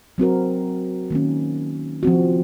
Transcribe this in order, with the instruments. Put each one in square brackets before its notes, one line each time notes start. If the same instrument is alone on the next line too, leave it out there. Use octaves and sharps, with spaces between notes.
[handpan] F#3 C4 F#4 A#4
D#3 A#3 C#4
F3 C4 F#4